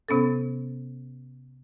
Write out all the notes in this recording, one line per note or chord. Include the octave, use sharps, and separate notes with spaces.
C3 B3 C#4 A4